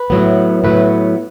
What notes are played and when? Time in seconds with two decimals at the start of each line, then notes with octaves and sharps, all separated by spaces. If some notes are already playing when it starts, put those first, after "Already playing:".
Already playing: B4
0.10 A2 F#3 B3
0.64 A2 F#3 B3 B4